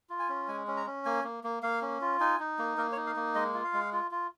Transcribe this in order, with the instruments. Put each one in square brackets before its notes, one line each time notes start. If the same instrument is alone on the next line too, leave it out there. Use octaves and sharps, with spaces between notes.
[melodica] F4
G#5
C#4
G#3 G#5
C#4
A#5
C#4
A#3 G#5
A#3
A#3
A#3 F5
C#4
F4
D#4 G#5
D#4
A#3
A#3 A#4
C#5
D#4
F5
A#3
G#3 D#5
F4
F5
G#3
F4
F4